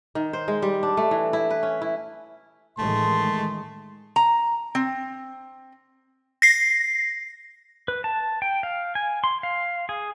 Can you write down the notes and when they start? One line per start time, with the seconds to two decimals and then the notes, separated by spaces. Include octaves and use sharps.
0.15 D#3
0.33 C5
0.48 G#3
0.62 G3
0.83 D4
0.97 A3
1.11 E3
1.33 E4
1.50 B4
1.63 C#4
1.82 E4
2.78 A1 D#3 G#3 A3 C6
4.16 A#5
4.75 C4
6.42 A#6 C7
7.88 B4
8.04 A5
8.42 G5
8.63 F5
8.95 G#5
9.24 C6
9.43 F5
9.89 G#4